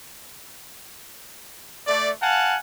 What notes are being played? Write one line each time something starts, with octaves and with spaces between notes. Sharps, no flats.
A3 D5
F5 F#5 G#5 A5